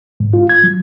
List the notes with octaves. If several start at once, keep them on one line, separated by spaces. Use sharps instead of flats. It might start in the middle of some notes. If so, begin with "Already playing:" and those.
G#2
F4
G#6
F#3